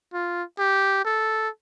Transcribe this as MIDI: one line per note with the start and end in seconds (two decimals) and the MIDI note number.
0.13 0.43 65
0.59 1.00 67
1.05 1.49 69